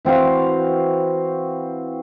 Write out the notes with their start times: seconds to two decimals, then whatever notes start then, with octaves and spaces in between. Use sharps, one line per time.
0.05 E3 C4 F#4 F5